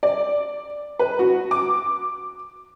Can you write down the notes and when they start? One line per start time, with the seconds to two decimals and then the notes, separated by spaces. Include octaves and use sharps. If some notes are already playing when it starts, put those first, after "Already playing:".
0.03 D5
0.99 B4
1.19 F#4
1.51 D6